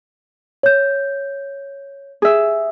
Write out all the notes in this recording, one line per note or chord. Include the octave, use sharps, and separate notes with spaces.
C#5 G6
G#4 E5